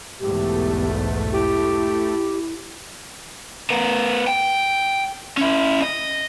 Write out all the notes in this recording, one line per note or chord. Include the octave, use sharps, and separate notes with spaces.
B1 E2 G#2 A3 G4
E4 G4
B3 A#4
G5
C#4 E4
D#5